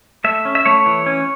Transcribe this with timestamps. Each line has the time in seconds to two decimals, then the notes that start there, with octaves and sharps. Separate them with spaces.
0.24 A3 E5
0.45 C#4
0.55 E5
0.65 A3 C#5
0.86 E3
1.06 C#4